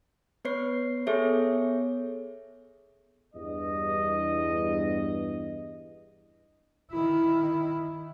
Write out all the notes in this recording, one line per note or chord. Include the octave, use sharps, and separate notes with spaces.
B3 B4 C#5 C7
B3 G#4 A4 C#5 E5
E2 G2 D#5
D#3 E4